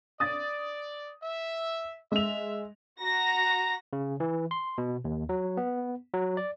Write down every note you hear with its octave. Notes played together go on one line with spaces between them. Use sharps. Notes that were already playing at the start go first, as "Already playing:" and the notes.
D5 D#6 A6
E5
G#3 E5 F7
F#4 A#5 A#6
C#3
E3
C6
B2
D#2
F#3
B3
F#3
D5